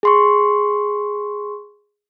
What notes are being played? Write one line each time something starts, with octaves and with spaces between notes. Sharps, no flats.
G#4 C6 C#6